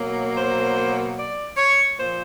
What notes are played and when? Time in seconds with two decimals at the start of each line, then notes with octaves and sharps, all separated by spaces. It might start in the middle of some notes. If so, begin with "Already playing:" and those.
Already playing: B2 F#3 A#3
0.35 C5
1.16 D5
1.57 C#5
1.97 A#2 F3 A#3 C5